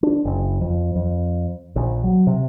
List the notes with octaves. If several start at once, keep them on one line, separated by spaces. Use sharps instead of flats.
D4
F#1
F2
F2
A#1
F#3
C3